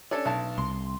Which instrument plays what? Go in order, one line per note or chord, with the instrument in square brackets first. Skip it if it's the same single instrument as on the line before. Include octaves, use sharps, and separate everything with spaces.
[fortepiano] C#4 D4 A4
B1 A5
[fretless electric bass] C2 [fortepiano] C6